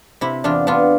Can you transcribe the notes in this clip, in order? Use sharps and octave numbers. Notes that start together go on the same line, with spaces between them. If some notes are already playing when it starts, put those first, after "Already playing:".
C3 E4
E2 D4 F4
B3 D4 F4